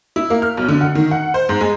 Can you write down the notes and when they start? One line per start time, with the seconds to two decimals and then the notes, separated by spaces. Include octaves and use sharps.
0.16 E4
0.30 A#3
0.42 F6
0.57 B1
0.69 D3
0.81 F#5
0.95 D#3
1.11 F#5
1.34 C5
1.49 G#2
1.61 G#3